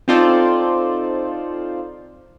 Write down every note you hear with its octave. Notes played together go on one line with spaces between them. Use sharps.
C4 D#4 F4 A4 C5 D5